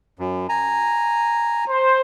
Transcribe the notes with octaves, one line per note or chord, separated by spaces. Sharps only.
F#2
G#5 A#5
C5